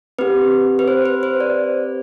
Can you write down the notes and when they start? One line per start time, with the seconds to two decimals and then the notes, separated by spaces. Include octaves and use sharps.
0.19 C4 G4 B4
0.79 B4
0.88 C5
1.06 B4
1.23 C5
1.40 D5